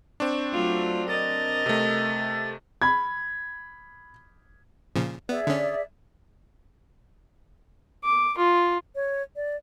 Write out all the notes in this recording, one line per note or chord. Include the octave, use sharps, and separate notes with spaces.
C4 D4 C#6
F#3 A3 F4
A#4 D#5 A6
C3 A3
B5 G#6
A#2 C#3 F3
B3 G#4 D5 E5
D3 C#4
D6
F4
C#5
D5